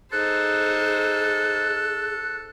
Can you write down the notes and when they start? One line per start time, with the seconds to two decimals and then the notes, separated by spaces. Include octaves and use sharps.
0.12 D#4 G#4 A4 C5 F#6